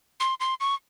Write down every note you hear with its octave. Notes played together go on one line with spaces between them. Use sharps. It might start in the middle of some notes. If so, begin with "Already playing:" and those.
C6
C6
C#6